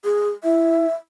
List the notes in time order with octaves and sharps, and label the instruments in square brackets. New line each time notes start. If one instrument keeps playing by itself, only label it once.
[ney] G#4
[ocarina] E4 [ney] E5